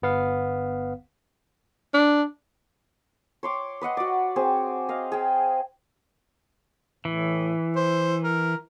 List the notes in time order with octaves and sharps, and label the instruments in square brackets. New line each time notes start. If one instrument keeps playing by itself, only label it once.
[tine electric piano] G1 B3 F5
[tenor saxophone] D4
[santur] C#5 C6 D6
B4 D#5 F#5 C6
F#4 D5
C4 G#4
D#5 F5
G#4 G5
[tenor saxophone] A2 [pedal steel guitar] E3
[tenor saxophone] C5
A#4